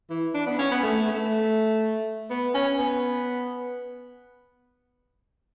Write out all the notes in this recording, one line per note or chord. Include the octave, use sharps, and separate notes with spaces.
E3
D4
B3
C#4
B3
A3
A3
B3
C#4
B3